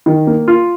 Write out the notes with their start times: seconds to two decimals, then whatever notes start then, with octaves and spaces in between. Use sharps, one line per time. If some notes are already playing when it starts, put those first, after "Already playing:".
0.06 D#3
0.27 A#3
0.48 F4